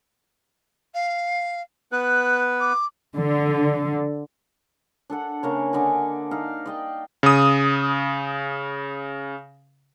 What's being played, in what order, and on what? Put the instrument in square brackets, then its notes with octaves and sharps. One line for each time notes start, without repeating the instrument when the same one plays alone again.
[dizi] F5
[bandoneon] B3 B4 [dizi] F#6
[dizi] D6
[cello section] D3
[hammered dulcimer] D4 A4 F#5
C#3 A#3 C#5
D3 D5 D#5 G#5
D#4 D5 F5
D5 D#5 G5
[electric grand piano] C#3 D#6